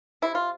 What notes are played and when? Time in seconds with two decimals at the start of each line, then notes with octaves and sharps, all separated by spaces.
0.22 C3 E4
0.35 F4